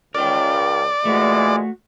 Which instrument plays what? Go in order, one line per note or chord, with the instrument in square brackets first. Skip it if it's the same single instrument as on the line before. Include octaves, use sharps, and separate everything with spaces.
[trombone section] C#2 [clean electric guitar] A#4 G5 [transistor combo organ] D5
[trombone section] A#2 E3 G#3 [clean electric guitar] A3 F#4